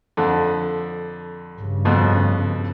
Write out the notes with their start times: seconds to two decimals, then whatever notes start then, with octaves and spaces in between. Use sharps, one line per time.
0.17 F2 D3
1.54 G2 C#3
1.85 F2 B2